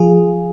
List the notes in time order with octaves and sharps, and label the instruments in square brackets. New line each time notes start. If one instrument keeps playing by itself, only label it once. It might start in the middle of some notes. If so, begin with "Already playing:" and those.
Already playing: [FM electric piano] F3 F4 G#4